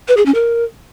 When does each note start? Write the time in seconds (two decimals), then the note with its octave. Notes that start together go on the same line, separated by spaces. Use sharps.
0.08 B4
0.17 G#4
0.26 C#4
0.34 A#4